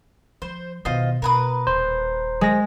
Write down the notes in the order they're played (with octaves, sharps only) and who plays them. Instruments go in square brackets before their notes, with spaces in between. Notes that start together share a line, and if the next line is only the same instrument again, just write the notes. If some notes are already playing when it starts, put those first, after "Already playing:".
[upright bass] F3 [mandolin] C5
[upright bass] B2 D#3 [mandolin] F4 C5 D#5
[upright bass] B2 [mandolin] A#4 B4 D#6
[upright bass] D#1 [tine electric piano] C5
[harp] G#3 A#6 [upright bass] C#4